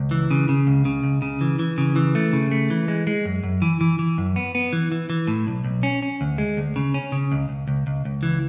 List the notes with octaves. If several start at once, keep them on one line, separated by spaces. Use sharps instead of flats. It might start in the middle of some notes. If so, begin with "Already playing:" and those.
Already playing: C#2
E3
C#3
C#3
C#2
C#3
C#2
C#3
E3
E3
C#3
E3
A3
C#3
A3
E3
G#3
G#3
F#2
F#2
E3
E3
E3
F#2
B3
B3
E3
E3
E3
A2
B1
B1
C#4
C#4
D2
G#3
D2
C#3
C#4
C#3
C#2
C#2
C#2
C#2
C#2
E3